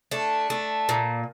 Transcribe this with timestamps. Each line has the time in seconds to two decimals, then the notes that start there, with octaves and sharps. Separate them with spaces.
0.11 A3 D4
0.50 A3
0.89 A#2